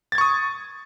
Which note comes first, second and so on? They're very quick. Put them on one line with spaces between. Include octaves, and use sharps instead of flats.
A6 G#6 C#6 D#6